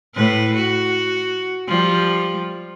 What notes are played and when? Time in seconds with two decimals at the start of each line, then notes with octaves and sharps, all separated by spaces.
0.15 A2 B4
0.56 F#4
1.67 F3 G3